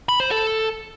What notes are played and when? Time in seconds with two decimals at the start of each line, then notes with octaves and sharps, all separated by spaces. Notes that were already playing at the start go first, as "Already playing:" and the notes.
0.09 B5
0.20 C5
0.31 A4